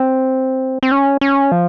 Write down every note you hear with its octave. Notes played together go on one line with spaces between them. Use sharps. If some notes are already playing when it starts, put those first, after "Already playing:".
Already playing: C4
C4
C#4
C#4
F3